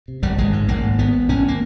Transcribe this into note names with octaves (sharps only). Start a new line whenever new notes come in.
C3
F#1 G3
G#1 G#3
G#2
G#1 A#3
G#2
G#1 B3
G#2
G#1 C#4
A#3